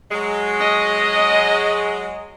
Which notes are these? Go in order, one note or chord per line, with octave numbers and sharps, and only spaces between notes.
F#3 G#3
D#5